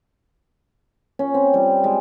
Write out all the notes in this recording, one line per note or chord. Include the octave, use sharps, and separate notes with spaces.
C#4
C4
G3
G#3